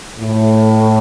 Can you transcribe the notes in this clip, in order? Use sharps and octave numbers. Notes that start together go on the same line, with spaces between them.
A2